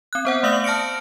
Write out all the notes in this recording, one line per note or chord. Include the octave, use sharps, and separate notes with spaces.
C4 F#6
B3 C5 F#5
A3 D5 F5 D#6 E6 F#7
A5 F6 A#6 C#7 D7